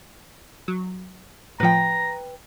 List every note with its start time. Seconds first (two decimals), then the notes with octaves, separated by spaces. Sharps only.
0.68 F#3
1.60 A2 F3 B4 G5 A#5